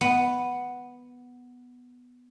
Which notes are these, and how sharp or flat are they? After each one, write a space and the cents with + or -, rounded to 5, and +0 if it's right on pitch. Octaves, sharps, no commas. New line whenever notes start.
B3 +0